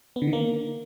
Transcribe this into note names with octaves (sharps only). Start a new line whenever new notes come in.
B3
D3
D#3
A#3